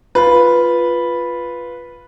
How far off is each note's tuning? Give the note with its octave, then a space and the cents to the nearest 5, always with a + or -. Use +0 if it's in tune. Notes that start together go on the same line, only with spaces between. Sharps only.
F4 +0 B4 -5